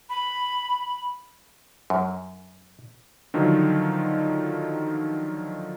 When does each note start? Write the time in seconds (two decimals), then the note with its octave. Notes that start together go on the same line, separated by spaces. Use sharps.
0.10 B5
1.90 F#2
3.34 D3 D#3 F3 F#3 D#4 F4